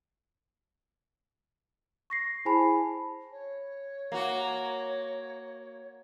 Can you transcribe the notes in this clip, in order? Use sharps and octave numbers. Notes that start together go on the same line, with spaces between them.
C#6 A#6 C7
E4 G#4 C5 G#5 A5 B5
C#5
A#3 F#4